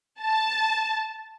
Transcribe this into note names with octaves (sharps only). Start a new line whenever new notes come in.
A5